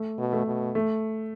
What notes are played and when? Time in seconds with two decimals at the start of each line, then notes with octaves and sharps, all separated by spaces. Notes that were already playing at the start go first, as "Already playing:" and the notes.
Already playing: A3
0.19 B2
0.33 A3
0.46 B2
0.75 A3